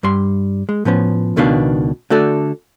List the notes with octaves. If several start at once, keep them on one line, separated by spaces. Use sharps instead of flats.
G2 G3 C6
G#3
A2 F3 B3 C#4
C#2 B2 D#3 B3 D4 F5
D3 A3 F#4 A4 D5